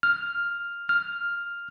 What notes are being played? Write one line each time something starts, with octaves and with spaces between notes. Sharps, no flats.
F6
F6